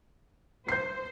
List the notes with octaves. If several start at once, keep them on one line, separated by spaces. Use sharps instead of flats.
C5 G6 C7